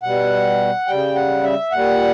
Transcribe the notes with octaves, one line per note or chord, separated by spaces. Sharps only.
B2 G3 F#5
C#3 G3 G5
F#5
E5
A#2 G3 F#5